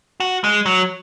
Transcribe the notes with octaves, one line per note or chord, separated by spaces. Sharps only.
F#4
G#3
F#3